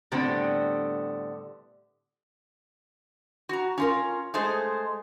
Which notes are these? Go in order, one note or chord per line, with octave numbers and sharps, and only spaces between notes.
A2 D3 G3 B3 C4
F#4 A#5
C#4 F4 A#4
G#3 A3 G#4 C5 D#5